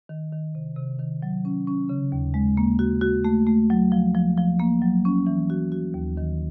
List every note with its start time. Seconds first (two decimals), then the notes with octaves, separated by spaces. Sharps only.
0.09 D#3
0.32 D#3
0.55 C3
0.77 C3
0.99 D#3
1.23 F#3
1.45 C#4
1.67 C#4
1.89 C#3
2.12 D#2
2.34 G#3
2.57 A#3
2.79 F#4
3.01 F#4
3.25 A3
3.47 A3
3.70 F#3
3.92 F3
4.15 F3
4.38 F3
4.60 A#3
4.82 F#3
5.05 C#4
5.27 E3
5.50 F#4
5.72 F#4
5.94 D#2
6.17 D#3